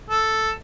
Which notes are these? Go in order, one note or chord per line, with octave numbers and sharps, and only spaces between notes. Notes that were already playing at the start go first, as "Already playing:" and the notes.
A4